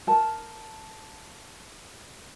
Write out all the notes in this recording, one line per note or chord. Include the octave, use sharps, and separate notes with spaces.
A#4 A5